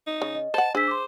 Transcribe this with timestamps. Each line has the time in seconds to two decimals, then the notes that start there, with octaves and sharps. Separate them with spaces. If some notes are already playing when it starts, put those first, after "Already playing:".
0.07 D#4
0.22 C#3
0.35 D#5
0.54 C5 F#5 A5
0.75 D4 G#4 C5 E6 B6
0.87 C6 D6